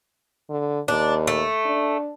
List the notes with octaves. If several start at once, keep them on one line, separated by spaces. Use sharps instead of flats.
D3
D#2 D4
A3
D4